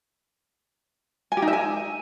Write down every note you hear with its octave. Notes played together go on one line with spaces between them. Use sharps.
G#5
G4
D#4
E5
G#5